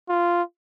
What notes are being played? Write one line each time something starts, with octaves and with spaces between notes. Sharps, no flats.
F4